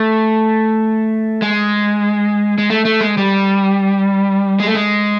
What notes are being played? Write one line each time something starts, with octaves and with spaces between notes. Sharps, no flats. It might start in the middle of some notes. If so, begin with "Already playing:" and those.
Already playing: A3
G#3
G#3
A3
A3
G#3
G3
G#3
A3
G#3